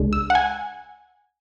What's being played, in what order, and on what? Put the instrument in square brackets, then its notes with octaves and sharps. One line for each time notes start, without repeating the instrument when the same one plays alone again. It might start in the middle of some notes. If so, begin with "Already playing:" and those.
Already playing: [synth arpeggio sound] C#2 G#3 D4
E6
F#5
G#5